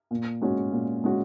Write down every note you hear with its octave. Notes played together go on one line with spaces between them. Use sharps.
A#2
G#3 C#4 F#4
A#2
G#3 C#4 F#4